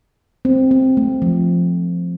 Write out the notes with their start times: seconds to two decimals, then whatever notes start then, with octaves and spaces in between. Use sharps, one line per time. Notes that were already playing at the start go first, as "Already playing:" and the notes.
0.45 C4
0.71 C4
0.97 A3
1.22 F3